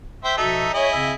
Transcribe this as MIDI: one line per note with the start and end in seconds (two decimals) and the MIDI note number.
0.24 0.34 72
0.24 0.34 76
0.24 0.34 79
0.37 0.66 47
0.37 0.66 53
0.37 0.72 63
0.37 0.66 66
0.37 0.72 69
0.37 0.72 76
0.74 1.13 64
0.74 1.13 68
0.74 0.87 73
0.74 1.13 75
0.92 1.12 49
0.92 1.12 60
0.92 1.12 76